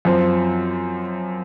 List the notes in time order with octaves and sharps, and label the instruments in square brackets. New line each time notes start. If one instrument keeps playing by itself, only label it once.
[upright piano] F#2 F3 C4